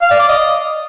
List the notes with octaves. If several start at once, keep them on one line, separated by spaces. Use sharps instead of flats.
F5
D5
D6
D#5